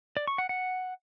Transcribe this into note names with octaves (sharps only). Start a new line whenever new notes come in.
D5
C#6
F#5
F#5